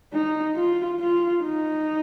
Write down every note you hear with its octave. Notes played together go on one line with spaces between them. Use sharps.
D#4
F4
F4
D#4